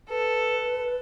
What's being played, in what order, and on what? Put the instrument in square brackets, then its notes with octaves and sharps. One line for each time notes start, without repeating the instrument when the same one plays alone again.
[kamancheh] A4 [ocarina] B4